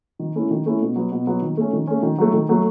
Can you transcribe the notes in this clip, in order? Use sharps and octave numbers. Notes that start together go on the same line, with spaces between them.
D#3
A3 C#4 E4
D#3
A3 C#4 E4
B2
F#3 B3
B2
F#3 B3
D#3
A3 C#4
D#3
A3 C#4
D#3
F#3 A3
D#3
F#3 A3